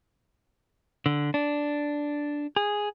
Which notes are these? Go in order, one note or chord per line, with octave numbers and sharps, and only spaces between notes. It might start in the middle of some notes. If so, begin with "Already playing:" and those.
D3
D4
G#4